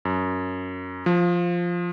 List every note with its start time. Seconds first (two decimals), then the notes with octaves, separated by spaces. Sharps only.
0.05 F#2
1.06 F3